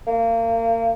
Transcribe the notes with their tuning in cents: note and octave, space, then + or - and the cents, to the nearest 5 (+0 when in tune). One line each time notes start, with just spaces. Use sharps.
A#3 -30